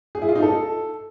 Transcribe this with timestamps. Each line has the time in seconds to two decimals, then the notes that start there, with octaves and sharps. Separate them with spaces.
0.15 G#4
0.22 E4
0.29 F4
0.35 D#4
0.42 A4